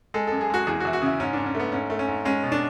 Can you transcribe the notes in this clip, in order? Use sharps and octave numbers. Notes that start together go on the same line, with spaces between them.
G#3 A4
F#2 A4
G#4
G#3 F#4
E2 G#4
F#4
E2 E4
F#4
C#3 E4
G#2 C#4
G#2 D4
C#4
A3 B3
G#2 C#4
A3
C#4
G#2
G#3 C#4
B2
D4